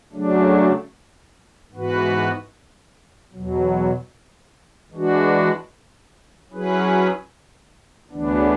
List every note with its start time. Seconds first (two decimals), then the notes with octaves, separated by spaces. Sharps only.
0.13 C#3 F#3 A3 D4
1.72 G#2 E3 B3 F#4 B4
3.32 E2 B2 F#3
4.92 E3 G#3 D4 F#4
6.51 F#3 C#4 E4 G#4 B4
8.11 D2 C#3 E3 B3 D4